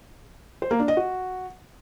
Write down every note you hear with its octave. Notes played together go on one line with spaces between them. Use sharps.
C5
A#3
D4
D#5
F#4